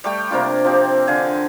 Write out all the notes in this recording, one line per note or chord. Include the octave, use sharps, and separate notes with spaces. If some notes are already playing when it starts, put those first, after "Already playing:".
G3 A3 G5
C3 A#3 D4 F4
F3 C4 G4
D3 F5 G#5